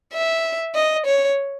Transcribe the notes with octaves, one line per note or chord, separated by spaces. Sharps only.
E5
D#5
C#5